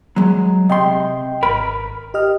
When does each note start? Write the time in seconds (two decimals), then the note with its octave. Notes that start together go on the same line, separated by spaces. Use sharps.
0.16 F#3 G#3
0.69 C3 D#5 G5 C6
1.43 G#1 A#4 B5
2.14 G4 D#5 F6